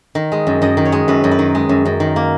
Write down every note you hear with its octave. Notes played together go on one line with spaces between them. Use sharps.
D#3
G#3
F#2
F#2 D#5
D#3
C#5
G#3
F#2 B4
F#2
B4
D#3
G#3
F#2
F#2
D#3
A#3